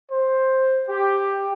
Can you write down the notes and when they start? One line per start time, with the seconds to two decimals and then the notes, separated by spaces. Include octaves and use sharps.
0.12 C5
0.89 G4